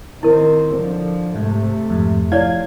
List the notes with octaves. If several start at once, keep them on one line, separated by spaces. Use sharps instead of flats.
D#3 C4 E4 A#4
D3 F3
G#2 C3 A3
F2 G#2
F3 E4 C#5 D5 F5 G#6